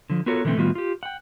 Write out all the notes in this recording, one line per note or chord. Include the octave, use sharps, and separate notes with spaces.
D3 F3
B3 F4 F#4 A4 A#4 C#5
B2 D3 E3 G#3 A3 C4
A2 D#3 G3 B3 F4 F#4
F4 G4
F#5 G5